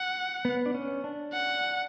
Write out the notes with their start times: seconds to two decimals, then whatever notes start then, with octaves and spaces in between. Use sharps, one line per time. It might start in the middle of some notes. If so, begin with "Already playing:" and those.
Already playing: F#5
0.45 B3
0.66 D4
0.74 C#4
1.04 D4
1.33 F#5